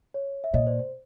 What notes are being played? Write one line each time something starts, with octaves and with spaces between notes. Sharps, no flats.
C#5
E5
A#2 C#5 D#5
C5 D5
C5